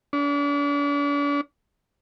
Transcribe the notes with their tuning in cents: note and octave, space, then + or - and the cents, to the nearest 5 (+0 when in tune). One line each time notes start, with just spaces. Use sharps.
D4 -40